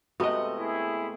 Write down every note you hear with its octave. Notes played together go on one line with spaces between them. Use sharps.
C3 G#3 A3 B3 F#4 D#5
E4 G#4